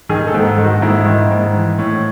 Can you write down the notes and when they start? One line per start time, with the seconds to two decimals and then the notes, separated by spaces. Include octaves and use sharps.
0.09 D#3 G#4
0.27 A4
0.34 G#2
0.45 A4
0.58 D#3
0.64 F#4
0.82 G#2 E4
1.06 D#3
1.31 G#2
1.54 E3
1.79 A2